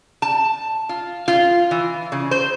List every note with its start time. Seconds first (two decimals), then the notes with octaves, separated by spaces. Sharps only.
0.22 A5
0.89 F4
1.28 F4
1.71 E3
2.12 C#3
2.31 C5